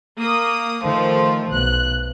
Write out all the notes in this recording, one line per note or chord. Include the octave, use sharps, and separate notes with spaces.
A#3 D#6
D#3 F3 A3
B1 F#6